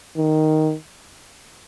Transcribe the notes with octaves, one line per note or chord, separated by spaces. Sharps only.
D#3